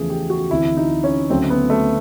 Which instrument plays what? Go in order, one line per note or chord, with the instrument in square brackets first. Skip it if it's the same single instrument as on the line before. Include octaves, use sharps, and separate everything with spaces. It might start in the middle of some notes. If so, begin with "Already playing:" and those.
Already playing: [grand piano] E2 C#3 F3 A3 G#4
G4
F#4
D2 C3 E3 E4
D#4
C#4
D2 C#3 F#3 A3 C4
B3
A3